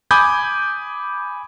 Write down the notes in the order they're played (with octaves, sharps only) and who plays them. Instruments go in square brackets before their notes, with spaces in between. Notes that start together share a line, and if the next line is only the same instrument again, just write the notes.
[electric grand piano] G#5 B5 D6 D#6 G6 G#6